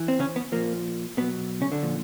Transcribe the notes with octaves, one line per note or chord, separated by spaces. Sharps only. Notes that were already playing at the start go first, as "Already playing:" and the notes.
Already playing: E3
C4
C#3 C#4
B3
A#2 F3 A#3
B2 F#3 B3
C#3 C#4
D3 D4
A#2 F3